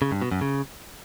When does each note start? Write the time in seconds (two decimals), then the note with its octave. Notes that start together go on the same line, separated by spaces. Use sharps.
0.02 C#3
0.12 G2
0.22 B2
0.31 F#2
0.41 C#3